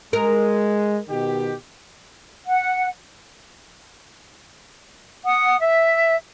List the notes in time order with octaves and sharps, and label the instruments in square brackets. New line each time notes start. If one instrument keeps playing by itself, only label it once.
[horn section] G#3 [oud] A#4
[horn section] B2 D#3 G4
[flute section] F#5
F#5 D#6
E5